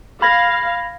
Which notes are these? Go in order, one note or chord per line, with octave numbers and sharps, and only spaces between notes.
F5 B5 G#6 A#6